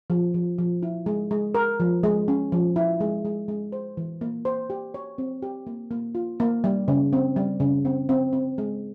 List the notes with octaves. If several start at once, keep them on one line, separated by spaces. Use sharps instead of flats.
F3
F3
F3
E4
G#3
G#3
A#4
F3
G#3
C#4
F3
E4
G#3
G#3
G#3
C5
E3
A#3
C5
G4
C#5
C4
G4
A#3
A#3
F4
A#3
G3
C#3
C4
G3
C#3
C4
C4
C4
G#3